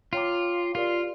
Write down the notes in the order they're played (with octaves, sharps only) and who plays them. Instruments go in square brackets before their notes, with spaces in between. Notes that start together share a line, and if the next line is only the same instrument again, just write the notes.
[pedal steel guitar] F4 [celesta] C#5 G5 A#5 D6
[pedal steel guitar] F4 [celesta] G4 A#4 D5